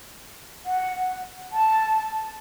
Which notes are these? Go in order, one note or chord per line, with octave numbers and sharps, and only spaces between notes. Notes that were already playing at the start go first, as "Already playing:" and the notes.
F#5
A5